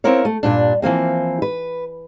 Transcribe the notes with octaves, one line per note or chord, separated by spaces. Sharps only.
A#3 C4 E4 A#4 C#5
A3
G2 A#2 D4
E3 F3 A#3 C4
B4